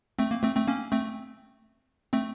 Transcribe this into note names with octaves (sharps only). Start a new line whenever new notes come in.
A3 C4
A#3
A3 C4
A3 C4
A#3 C#4
A3 C4
A3 C4